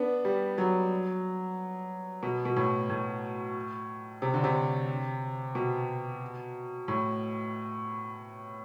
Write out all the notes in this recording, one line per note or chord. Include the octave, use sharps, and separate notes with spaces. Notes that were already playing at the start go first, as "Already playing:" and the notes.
Already playing: B3 D4
G3
F#3
B2
B2
A2
A2
C3
D3
C3
B2
A2